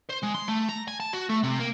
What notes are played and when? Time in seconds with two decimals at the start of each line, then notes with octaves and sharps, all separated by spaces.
0.09 C5
0.23 G#3
0.34 C6
0.48 A3
0.69 A#5
0.88 G#5
1.00 A5
1.13 F#4
1.29 A3
1.44 C3
1.60 A#3